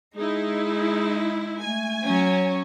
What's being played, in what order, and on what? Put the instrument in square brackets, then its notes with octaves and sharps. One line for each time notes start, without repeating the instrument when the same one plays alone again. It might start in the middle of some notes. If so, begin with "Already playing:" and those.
[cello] G#3 [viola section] D#4 E4 [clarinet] G#4
[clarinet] A3 [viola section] G#5
[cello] F#3 [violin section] C#4